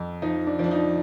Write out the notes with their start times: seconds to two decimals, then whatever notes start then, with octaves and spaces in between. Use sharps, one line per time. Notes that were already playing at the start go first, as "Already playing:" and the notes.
Already playing: F2
0.22 F3 D#4
0.47 D4
0.59 F3 D4
0.71 D#4